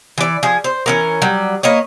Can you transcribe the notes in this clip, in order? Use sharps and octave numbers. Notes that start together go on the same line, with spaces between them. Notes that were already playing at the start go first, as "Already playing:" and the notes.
E3 D5
F3 G#4
C5
E3 C#4 A#4
F#3 G3
A#3 B4 C#5 D#5